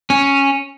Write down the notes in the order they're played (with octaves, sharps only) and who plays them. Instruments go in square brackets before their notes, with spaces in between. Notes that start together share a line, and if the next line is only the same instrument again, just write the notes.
[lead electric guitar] C#4